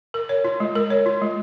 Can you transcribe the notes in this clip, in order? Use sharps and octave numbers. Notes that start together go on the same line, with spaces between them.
A#4
C#5
F4
G#3
A#4
C#5
F4
G#3